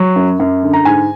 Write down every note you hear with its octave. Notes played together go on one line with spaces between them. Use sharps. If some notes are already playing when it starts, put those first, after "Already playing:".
Already playing: F#3
F#2
F#2
D3
A#5
G#2 G#5